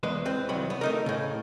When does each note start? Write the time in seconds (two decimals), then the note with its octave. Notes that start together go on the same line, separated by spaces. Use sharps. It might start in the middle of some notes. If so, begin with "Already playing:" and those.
0.03 E2 G#3 B4
0.26 C4 B4
0.49 C2 D#3 F#3 B5
0.70 B3
0.81 A3 D#4 A#4
1.06 A2 C#3